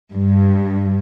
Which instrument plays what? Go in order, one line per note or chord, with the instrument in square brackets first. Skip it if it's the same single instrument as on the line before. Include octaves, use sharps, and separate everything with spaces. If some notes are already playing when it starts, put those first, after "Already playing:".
[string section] G2